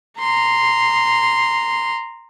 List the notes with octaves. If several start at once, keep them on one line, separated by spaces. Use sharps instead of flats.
A#5 C6